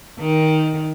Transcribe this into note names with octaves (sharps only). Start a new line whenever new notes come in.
D#3